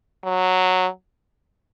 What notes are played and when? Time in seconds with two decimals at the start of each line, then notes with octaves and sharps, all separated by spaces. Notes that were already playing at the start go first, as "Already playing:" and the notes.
0.24 F#3